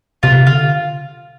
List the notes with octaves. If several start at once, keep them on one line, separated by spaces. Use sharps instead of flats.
C3 F4
D3 F4